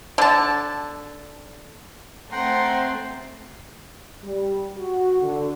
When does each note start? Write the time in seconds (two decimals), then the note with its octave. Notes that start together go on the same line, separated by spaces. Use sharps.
0.18 D3 A5
2.32 A3 C4 F#5 G5 A#5 C6
4.23 G3
4.77 F#4
5.22 D3